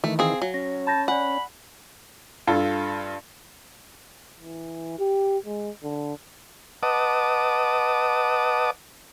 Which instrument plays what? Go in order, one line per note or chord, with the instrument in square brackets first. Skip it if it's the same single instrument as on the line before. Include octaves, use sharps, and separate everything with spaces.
[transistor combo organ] D#3 E3 [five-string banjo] A3
[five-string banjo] C4 G#4 [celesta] F5 G#5
[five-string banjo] F#3
[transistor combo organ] C#4 [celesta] A#6
[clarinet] A5 [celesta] B5 G6 A#6
[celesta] D5 G#5 [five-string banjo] F#5 [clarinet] B5
[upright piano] G2 F4 A4
[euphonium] E3
G4
G#3
D3
[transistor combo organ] B4 D#5 F#5 A5 D6 D#6